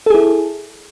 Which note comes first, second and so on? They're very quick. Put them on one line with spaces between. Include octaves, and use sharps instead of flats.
A4 G#4 E4